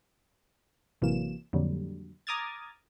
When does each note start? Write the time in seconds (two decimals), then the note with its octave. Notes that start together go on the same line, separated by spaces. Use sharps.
1.02 A1 C3 E3 F#3 A#3 E7
1.53 F2 A#2 D3 F#3 G3
2.27 A#5 D6 D#6 F6 G#6 A6